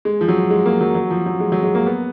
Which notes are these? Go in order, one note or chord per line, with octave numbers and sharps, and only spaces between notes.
G#3
F3
F#3
G#3
A#3
F#3
F#3
F3
F#3
G#3
F#3
G#3
A#3
B3